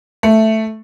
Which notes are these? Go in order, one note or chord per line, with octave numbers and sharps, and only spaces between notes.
A3